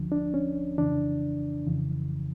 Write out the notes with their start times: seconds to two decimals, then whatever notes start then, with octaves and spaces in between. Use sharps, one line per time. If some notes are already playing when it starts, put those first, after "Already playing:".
Already playing: D2 D3 F3
0.12 D4
0.34 C#4
0.78 F2 C#3 E3 D4
1.66 F2 C#3 E3